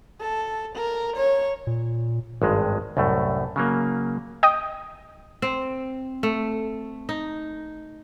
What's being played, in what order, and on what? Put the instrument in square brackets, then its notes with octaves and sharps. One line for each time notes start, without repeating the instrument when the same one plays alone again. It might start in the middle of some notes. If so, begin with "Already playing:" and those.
[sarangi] A4
A#4
C#5
[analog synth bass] A#2
[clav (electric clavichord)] G#1 G2 G#3
C2 F#2 A2 A3
C#3 F#3 A#3
[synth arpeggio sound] D#5 G5 D#6
[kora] C4
A3
D#4